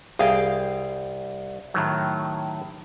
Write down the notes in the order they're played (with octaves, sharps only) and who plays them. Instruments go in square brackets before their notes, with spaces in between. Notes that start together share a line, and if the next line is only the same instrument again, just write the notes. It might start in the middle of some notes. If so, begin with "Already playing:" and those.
[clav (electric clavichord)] C2 [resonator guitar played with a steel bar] G#4 F5 G5
[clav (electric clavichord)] A2 D#3 F#3